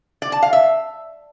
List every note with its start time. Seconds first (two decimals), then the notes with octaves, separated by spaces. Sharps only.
0.22 D5
0.32 A5
0.42 F5
0.53 E5